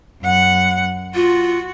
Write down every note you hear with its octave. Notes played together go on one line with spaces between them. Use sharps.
F#2 F#5
F4 F#4